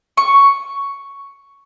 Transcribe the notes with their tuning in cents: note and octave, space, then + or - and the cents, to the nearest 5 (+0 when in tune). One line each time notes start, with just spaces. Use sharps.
C#6 +5